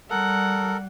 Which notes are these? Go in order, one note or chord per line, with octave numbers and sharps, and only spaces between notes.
G3 A4 A#4 F#5